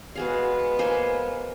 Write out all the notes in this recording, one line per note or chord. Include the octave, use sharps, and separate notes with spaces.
G#3 B3 F#4 G#4 F5
A#3 C5 G#5